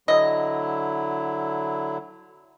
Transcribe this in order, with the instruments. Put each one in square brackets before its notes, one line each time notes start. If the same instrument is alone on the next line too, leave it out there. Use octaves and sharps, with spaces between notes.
[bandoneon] D3 F#3 E4 [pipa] D#5